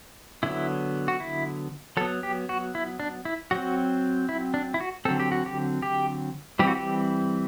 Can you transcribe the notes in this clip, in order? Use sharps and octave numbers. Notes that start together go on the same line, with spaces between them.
D3 F#3 B3 E4
F#4
E4
F#3 B3 A4
G4
F#4
E4
D4
E4
F#3 C4 F#4
E4
D4
E4
F#4
D3 F#3 C4 A4
G4
F#4
G4
G4
E3 G3 C4 G4
F#4
G4